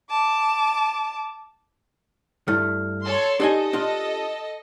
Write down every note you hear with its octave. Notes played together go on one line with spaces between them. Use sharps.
A5 D6
G2 A3 E4 F6
A4 C#5 C6
D4 D#4 G4 A4 D#5 G#5
D4 F4